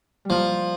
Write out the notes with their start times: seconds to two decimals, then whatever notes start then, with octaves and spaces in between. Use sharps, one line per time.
0.25 F3 G3 A#3